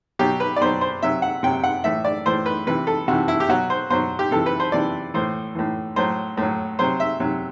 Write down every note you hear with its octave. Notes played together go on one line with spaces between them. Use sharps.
B2 F#3 G4
B4
D5
B2 F#3 C5
C5
C3 F#3 E5
F#5
C3 F#3 G5
F#5
A2 E3 E5
D5
A2 E3 C5
B4
C3 E3 B4
A4
C3 E3 F#4
E4
G4
B2 F#3 F#4
C5
B2 F#3 C5
G4
C3 E3 A4
B4
C5
C3 E3 D5
A2 E3 C5
A2 E3
A2 F#3 C5
A2 F#3
C3 F#3 C5
E5
C3 F#3